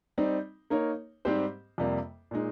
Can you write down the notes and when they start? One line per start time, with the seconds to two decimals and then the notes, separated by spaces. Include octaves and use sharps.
0.18 G3 C4 D#4
0.70 A#3 D#4 A#4 C#5
1.25 G#2 G3 C4 G4 C5
1.78 F2 C3 G3 A#3
2.31 A#2 G#3 D#4